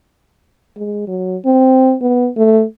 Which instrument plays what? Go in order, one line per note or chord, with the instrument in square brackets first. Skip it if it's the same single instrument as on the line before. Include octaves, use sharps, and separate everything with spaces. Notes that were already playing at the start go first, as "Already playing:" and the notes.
[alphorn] G#3
F#3
C4
B3
A3